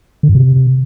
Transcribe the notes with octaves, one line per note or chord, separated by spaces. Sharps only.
D3
G2
C3